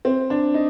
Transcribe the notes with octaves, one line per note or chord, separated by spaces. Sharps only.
C4
D4
D#4